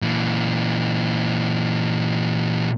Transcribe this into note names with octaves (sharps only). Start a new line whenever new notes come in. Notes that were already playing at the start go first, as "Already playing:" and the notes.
A#2 E3